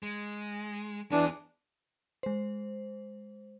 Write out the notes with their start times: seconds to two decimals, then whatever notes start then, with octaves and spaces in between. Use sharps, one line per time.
0.03 G#3
1.12 E3 B3 D4 G#4
2.23 G#3 C5